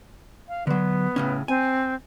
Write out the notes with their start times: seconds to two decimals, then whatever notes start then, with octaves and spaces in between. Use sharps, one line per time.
0.48 F5
0.67 D3 F#3 B3
1.16 A2 C#3 C#4
1.48 C4 G#5